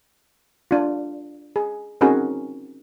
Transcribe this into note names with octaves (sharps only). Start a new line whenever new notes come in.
D4 F4
G#4
C4 C#4 D#4 F#4 G#4 A#4